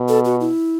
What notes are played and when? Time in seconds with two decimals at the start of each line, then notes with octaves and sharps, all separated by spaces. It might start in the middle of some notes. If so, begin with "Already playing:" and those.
Already playing: B2
0.08 A4
0.25 F#4
0.40 E4